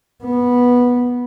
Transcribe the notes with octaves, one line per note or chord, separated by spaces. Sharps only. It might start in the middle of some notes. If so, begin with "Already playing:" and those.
B3